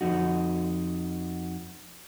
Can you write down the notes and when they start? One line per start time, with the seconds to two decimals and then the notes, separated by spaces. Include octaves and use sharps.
0.01 F2 D#4 F#4